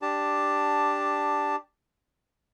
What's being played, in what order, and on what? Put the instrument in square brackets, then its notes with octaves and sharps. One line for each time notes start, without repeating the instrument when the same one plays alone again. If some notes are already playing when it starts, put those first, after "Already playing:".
[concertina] D4 G4 A5